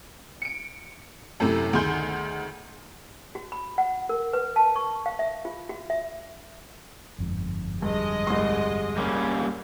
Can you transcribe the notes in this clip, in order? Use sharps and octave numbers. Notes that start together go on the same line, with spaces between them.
C#7 D7
F#2 A2 C3 A3 E4
D2 D#3 G#4 C6 G6
F#4
B5
F#5
A#4
B4
A5
C#6
F5
E5
F4
F#4
E5
G1 F2 G#2
G2 G#3 D#5
C2 C6
G3 A#3 C#4